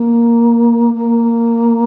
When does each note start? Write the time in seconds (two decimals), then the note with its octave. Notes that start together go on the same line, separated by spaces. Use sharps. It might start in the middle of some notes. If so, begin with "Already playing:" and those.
Already playing: A#3
0.94 A#3